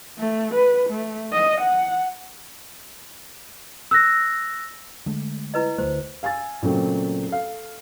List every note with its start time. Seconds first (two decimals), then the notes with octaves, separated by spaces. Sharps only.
0.19 A3
0.54 B4
0.90 A3
1.32 D#5
1.61 F#5
3.91 E6 F#6 A#6
5.06 D3 G#3 A3
5.54 E4 B4 D#5
5.78 D2 G3 A3 C5
6.23 F5 G#5 E6 A6
6.62 A#2 C#3 F#3 A3 C4
7.29 A4 F5